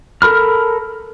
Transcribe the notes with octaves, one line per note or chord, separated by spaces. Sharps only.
A4 A#4 B5 F6